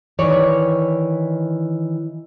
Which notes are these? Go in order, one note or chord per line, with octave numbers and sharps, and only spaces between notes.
D#3 E3 C#5 D5